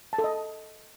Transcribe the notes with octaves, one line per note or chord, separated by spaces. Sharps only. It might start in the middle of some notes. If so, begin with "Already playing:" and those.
A5
A4
D#5